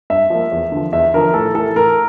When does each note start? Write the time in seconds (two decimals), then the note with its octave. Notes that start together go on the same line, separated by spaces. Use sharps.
0.10 G2 E5
0.30 F3 A#3
0.52 E2
0.72 D3 F3
0.92 E2 E5
1.14 D3 F3 A#4
1.34 A2 A4
1.55 E3 A3 A4
1.76 A2 A#4